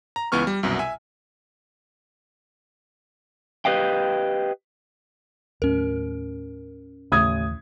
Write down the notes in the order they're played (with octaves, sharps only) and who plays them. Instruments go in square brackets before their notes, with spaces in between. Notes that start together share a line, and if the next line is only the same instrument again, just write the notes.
[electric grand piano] A#5
C#2 E3 B3 C#6 F6
G3
C2 F#2 B2
E5 G#5
[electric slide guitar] G4 B4 D#5 F5 G5
[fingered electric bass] D#2 A2 F#3 [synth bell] C#4 A#4
[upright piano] A1 D#6 G#6 [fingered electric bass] D#2 C#3